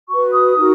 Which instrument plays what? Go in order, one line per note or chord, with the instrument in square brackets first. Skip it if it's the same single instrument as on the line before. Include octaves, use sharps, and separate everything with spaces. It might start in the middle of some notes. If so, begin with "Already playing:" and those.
[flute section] F#4 B4 C#6
D#6
D#4 F#4 A#4